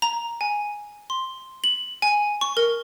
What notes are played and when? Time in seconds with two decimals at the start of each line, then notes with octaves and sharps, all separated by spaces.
0.02 A#5
0.41 G#5
1.10 C6
1.64 F#7
2.02 G#5
2.41 C#6
2.57 A#4